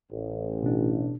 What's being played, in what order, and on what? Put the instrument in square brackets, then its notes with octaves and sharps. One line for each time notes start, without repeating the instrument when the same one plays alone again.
[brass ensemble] A1
[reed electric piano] B2 D4